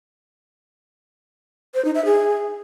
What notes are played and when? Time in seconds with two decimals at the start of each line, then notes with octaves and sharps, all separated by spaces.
1.74 C5
1.85 D#4
1.95 E5
2.05 G#4